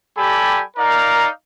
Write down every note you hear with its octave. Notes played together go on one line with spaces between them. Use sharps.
G3 G4 A4 G#5 B5
D#4 A#4 D5 F5 A#5